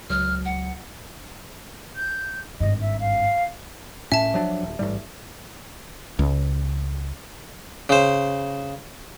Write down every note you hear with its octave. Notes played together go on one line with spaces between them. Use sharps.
C#2 F#3 F6
F#5
G6
G#1 G2 D#5
E5
F5
A2 C#4 E5 A5
F3 F#3 D4
D#1
A1 G#2 G3
C#2
C#3 C5